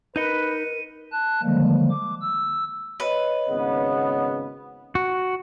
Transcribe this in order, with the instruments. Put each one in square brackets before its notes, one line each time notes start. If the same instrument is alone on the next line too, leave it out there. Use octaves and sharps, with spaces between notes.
[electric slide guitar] D#4 D#5 [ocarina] A#4 [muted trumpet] B4 [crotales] C#7 D#7
[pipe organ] A5 F#6
D3 D#3 F3 G3 G#3 A#3
D6
E6
[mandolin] B4 [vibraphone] C#5 D#5
[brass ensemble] G#1 C#3 B3
[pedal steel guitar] F#4